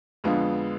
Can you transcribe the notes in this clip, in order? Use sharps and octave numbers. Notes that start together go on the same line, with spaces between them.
F2 D3 G#3 B3 F4